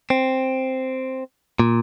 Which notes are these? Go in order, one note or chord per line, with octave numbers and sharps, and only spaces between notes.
C4
A#2